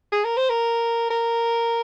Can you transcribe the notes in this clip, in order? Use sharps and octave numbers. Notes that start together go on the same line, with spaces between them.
G#4
A#4
C5
A#4
A#4